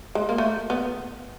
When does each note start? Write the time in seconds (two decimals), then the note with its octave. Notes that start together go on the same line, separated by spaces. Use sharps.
0.15 G#3
0.29 A#3
0.38 A3
0.70 B3